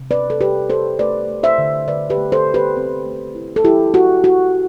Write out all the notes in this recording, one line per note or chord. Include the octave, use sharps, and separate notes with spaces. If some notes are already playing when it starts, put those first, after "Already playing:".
Already playing: C3
C4 B4 D5
A4
C3 G4 B4
C3 A4 C5
A3 B4 D5
A3
C5 E5
D3
D3 B4 D5
G4 B4
A3
A4 C5
D3
G4 B4
C4
A3
E4
A4
E4 G4
E4 F#4
E4 F#4